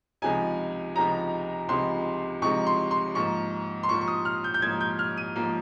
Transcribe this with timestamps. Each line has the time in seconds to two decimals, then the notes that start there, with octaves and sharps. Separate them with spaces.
0.22 C#2 C3 F3 G#3 D#4 G#5
0.95 C#2 C3 F3 G#3 D#4 A#5
1.69 C#2 C3 F3 G#3 D#4 C6
2.42 C#2 C3 F3 G#3 D#4 C#6
2.67 C6
2.91 C6
3.15 G#2 F3 A#3 C#6
3.83 C6
3.89 G#2 F3 A#3 C#6
4.01 C#6
4.08 D#6
4.25 F6
4.44 G6
4.54 G6
4.62 G#2 F3 A#3 G#6
4.81 G6
4.99 F6
5.18 D#7
5.36 G#2 F3 A#3